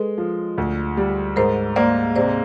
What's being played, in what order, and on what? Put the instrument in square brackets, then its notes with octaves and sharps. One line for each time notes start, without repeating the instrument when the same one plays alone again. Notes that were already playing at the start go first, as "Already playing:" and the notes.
Already playing: [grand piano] G#3 [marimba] A4 B4
[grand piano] F3
D2
G3
[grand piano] G#2 [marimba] A#4 C5
[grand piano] A#3 [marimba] C5 D5
[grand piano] C3 [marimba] C5 D5